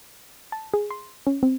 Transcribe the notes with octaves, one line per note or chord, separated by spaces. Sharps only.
A5
G#4
C6
C#4
C4